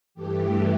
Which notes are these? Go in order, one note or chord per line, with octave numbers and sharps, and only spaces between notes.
G2 E3 A3 G4